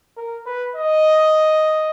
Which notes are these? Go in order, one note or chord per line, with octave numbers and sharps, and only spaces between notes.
A#4
B4
D#5